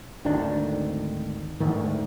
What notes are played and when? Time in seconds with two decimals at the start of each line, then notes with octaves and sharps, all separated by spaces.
0.25 G#1 D2 D#3 D4
1.60 D2 G#2 D#3